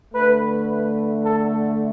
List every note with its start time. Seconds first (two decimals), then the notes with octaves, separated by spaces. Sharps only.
0.14 D3 A3 B4
0.69 B4
1.24 A4